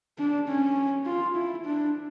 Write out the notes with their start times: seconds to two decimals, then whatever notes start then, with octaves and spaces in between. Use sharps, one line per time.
0.19 D4
0.48 C#4
1.06 F4
1.35 E4
1.65 D4